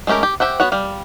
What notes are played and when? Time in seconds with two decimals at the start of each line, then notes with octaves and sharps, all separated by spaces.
0.07 G#3 A3 C#4 G4 A#4
0.23 G4
0.40 G4 C5 E5 F#5
0.60 B3 F#4 C#5 F#5
0.72 G3 F5